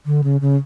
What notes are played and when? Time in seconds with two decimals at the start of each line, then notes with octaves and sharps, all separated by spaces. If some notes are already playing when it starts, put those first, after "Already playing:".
0.06 D3
0.24 C#3
0.41 C#3